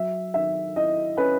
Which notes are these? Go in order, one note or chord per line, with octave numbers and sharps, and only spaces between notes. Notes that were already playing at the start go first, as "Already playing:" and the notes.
Already playing: F#3 E5
D#3 E5
E4 D#5
C#4 B4